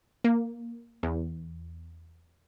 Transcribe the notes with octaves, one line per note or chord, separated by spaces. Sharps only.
A#3
E2